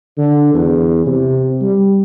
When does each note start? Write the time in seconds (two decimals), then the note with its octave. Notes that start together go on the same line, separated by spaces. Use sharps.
0.17 D3
0.54 E2
1.06 C3
1.62 G3